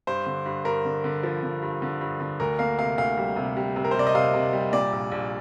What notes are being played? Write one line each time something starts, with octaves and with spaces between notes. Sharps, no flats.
G2 C5
D3
G2
G2 A#4
D3
D3
F3
D3
G2
D3
G2
D3
D2 A#4
A#3 F5
C3 F5
D2 F5
G3
C3
G3
C3
A#4
C5
C3 D5
D#5
C3 F5
C3
G3
A#2 D5
A#1
A#1